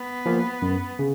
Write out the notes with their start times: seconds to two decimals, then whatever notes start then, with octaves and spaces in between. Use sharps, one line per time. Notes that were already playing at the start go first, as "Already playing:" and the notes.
Already playing: B3
0.26 F3 A#3
0.62 F#2
0.99 C#3